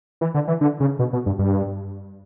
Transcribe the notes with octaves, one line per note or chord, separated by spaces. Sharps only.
E3
D3
E3
D3
C#3
B2
B2
G2
G2